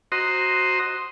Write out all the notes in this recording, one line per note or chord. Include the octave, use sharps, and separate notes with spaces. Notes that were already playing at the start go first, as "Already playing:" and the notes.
F#4 C5 D#5 A#5 C6